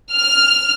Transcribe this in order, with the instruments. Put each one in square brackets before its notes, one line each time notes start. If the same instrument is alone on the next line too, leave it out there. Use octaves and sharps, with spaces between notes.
[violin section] F6